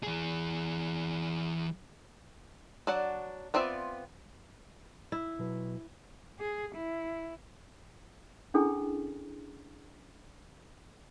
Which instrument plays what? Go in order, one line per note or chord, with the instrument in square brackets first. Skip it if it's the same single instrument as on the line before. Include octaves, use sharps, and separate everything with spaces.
[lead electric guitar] E3 G#4
[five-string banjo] F#3 D4 D5 F#5
B3 C4 F4 D5 E5
[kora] E4
[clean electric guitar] B2 F#3 B4
[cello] G#4
E4
[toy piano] C#4 D4 E4 G#4 A4 G5